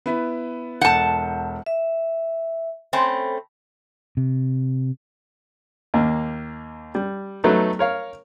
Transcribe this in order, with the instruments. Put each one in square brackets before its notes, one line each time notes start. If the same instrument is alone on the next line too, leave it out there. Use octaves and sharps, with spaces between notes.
[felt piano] B3 E4 B4
[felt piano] E1 A4 G6 [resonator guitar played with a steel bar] F#5 A5
[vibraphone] E5
[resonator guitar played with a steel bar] A3 C4 C#4 [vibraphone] B5
[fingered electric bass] C3
[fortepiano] D#2 A#3
G3
F#3 A3 B3 D#4 A4 B4
A#4 C#5 F5